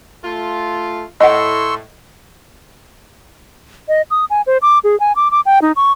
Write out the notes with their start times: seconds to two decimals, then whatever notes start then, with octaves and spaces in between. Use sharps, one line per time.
0.24 A3 F4
1.21 A2 D#5 F#5 C6 C#6 E6
3.88 D#5
4.11 D#6
4.30 G#5
4.47 C5
4.62 D6
4.84 G#4
5.00 G#5
5.16 D6
5.31 D6
5.46 G5
5.62 D#4
5.76 C#6